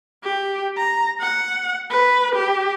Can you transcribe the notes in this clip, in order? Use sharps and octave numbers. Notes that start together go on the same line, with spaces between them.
G4
A#5
F#5
B4
G4